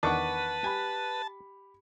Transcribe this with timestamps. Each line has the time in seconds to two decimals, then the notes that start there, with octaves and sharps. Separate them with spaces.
0.03 E2 D#3 D4 B4 F#5 A5 C#6 D6
0.64 G4 G#5 B5